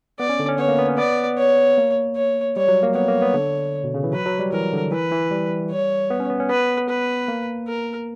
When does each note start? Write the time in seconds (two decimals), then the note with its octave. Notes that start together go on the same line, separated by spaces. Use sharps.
0.19 B3 D5
0.29 C#4
0.39 D3
0.49 C#4
0.58 B3 C#5
0.68 A#3
0.78 B3
0.89 C#4
0.98 B3 D5
1.37 C#5
1.78 A#3
2.16 C#5
2.56 G3 C#5
2.68 F#3
2.83 A#3
2.95 B3 C#5
3.08 A#3
3.22 B3
3.34 D3
3.84 B2
3.94 C#3
4.04 E3
4.13 F#3 B4
4.26 F#3
4.39 G3
4.52 E3 A#4
4.73 D3
4.92 E3 B4
5.12 E3
5.31 G3
5.71 C#5
6.10 B3
6.20 C#4
6.30 B3
6.40 C#4
6.49 B3 B4
6.89 B4
7.28 A#3
7.68 A#4